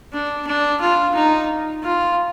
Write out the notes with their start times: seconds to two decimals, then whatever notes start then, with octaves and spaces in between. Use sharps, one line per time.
0.13 D4
0.47 D4
0.81 F4
1.15 D#4
1.83 F4